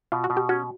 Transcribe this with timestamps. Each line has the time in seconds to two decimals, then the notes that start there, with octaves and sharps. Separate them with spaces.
0.12 B2 F4
0.24 F#4
0.30 B2
0.37 G4
0.49 C#4 F#4